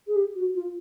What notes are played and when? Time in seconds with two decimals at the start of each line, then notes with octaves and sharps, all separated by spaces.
0.07 G#4
0.15 G4
0.35 F#4
0.55 F4